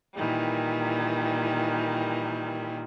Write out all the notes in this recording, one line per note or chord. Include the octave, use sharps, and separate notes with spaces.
A#2 D#3 E3 G3